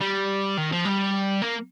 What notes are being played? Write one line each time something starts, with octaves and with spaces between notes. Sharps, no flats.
G3
D#3
F3
G3
A#3